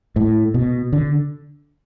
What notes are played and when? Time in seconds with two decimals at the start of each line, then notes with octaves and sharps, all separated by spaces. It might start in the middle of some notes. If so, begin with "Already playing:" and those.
0.16 A2
0.54 B2
0.93 D3